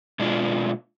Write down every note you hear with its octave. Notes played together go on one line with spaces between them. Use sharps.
B2 G#3 D4 F4